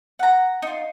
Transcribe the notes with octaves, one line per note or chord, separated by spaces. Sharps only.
F#5 A#5
D#4 F4